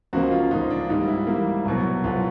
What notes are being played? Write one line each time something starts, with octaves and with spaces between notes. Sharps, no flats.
C#2 C#3 F3 A#3 F#4
F4
C#2 C#3 F3 A#3 D#4
D4
G#2 E3 G3 A#3 D#4
E4
G#2 E3 G3 A#3
C2 B2 F#3
C2 B2 F#3 F4